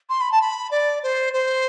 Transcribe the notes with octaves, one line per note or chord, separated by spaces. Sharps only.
C6
B5
A5
B5
D5
C5
C5